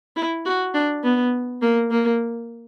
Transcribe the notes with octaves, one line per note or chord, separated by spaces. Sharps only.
E4
F#4
D4
B3
A#3
A#3